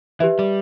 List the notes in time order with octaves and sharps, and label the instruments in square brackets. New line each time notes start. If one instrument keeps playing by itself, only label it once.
[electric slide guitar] E3 [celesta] G4 B4 E5
[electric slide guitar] G3